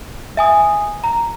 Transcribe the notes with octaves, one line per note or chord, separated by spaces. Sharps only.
E5 G#5 D#6
A#5